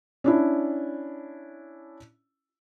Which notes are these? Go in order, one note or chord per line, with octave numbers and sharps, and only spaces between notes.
C#4 D4 E4